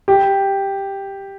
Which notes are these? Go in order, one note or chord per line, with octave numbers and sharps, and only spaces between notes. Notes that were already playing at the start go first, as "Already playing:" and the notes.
G4